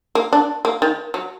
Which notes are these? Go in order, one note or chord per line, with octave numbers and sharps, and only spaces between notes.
A#3
D4
A#3
D#3
F#3